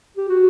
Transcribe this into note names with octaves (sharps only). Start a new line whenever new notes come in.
G4
F#4